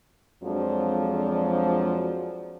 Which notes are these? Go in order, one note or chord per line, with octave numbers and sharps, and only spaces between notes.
F2 F3 F#3 G#3 D4